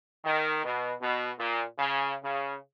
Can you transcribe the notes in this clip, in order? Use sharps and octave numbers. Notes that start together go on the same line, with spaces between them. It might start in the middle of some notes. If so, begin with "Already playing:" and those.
D#3
B2
B2
A#2
C#3
C#3